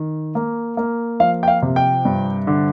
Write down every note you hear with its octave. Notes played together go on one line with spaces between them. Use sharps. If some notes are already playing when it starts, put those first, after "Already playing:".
Already playing: D#3
A#3
A#3
F3 F5
G5
F5
C3
G5
G2
D3